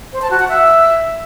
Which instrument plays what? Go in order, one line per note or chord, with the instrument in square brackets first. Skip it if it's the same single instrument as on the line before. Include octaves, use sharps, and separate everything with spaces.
[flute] C5
A5
F#4
F#5
E5